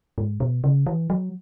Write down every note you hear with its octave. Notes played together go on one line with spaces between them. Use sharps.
G#2
B2
C#3
E3
F#3